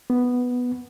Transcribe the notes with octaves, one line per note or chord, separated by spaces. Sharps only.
B3